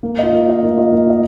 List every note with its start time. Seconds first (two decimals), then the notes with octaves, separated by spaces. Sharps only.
0.03 A#3
0.19 F4 D#5
0.33 A#3
0.48 F4 D#5
0.63 A#3
0.77 F4 D#5
0.92 A#3
1.07 F4 D#5